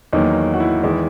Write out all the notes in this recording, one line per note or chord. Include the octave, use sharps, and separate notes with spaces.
E2 D#3 F#3 A#3 D#4
F#4
E4
E2 D#3 G#3